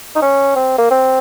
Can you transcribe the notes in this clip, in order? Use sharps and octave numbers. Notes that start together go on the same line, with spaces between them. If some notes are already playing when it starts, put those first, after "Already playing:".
D#4
C#4
C4
A#3
C4